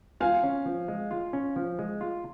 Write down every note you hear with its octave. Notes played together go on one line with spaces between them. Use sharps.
F4 F5 G#5
C#4
F3
G#3
F4
C#4
F3
G#3
F4